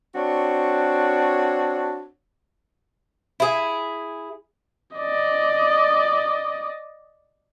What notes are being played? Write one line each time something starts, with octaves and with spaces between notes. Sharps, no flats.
C4 D4 F#4 C#5
E4 G#4
D5 D#5